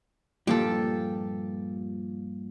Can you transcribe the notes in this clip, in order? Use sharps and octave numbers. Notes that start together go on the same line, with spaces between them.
G2 A#2 F3 G4 A4